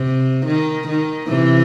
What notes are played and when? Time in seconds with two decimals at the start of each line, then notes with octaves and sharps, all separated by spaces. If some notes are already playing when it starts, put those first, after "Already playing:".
Already playing: C3
0.46 D#3
0.88 D#3
1.29 C3 E3